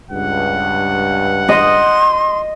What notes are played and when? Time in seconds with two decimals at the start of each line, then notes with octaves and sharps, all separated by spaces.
0.11 C#2 G2 F#5
1.49 D#5 C6